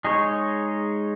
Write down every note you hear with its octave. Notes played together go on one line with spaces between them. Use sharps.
G#3 D#4 G#4 C#5